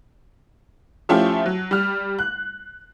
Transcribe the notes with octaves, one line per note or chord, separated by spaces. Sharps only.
F3 A3 C#4 E4 F4 G4
F#3
G3 F6
F#6